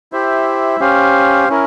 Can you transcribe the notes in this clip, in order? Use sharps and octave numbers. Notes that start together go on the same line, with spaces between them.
E4 G4 C5 E5
C#4 G4 C5 F5
C#4 E4 A#4